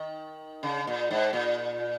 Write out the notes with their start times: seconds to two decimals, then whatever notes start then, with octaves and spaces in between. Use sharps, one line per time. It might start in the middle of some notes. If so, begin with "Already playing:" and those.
Already playing: D#3
0.63 C#3
0.87 A#2
1.11 G#2
1.33 A#2